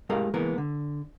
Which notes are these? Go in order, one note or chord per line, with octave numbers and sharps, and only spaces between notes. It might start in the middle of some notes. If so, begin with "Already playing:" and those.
A2 G#3 G4 A#4 F5 A#5
E3 G#3 A#3 B3 A#4
D3